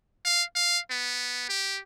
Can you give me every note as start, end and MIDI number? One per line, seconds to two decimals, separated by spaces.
0.25 0.43 77
0.55 0.79 77
0.90 1.45 59
1.49 1.80 67